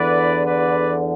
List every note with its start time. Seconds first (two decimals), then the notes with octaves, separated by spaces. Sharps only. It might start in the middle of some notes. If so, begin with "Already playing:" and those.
Already playing: E2 D3 B4 D5
0.44 B4 D5